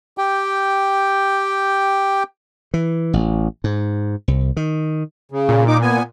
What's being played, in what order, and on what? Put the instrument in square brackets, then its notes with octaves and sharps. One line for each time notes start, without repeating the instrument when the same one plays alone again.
[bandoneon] G4 G5
[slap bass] E3
A1
G#2
C2
D#3
[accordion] C#3
[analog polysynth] A#2
[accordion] D#4 D6
B3 G#5